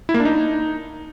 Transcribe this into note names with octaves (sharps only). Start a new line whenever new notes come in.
E4
A#3
D4
D#4